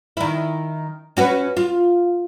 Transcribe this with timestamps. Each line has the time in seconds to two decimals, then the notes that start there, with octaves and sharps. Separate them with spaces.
0.17 D#3 E4
1.17 C#4 F#4 B4
1.57 F4